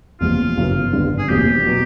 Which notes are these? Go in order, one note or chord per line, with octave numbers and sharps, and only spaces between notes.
F#1 E2 C3 F3 G#3 F4
G1 F#2 C#3 F#3 B3
G#1 G2 D3 G3
G#4
F1 E2 B2 G3 A#3 G4
B2 F#3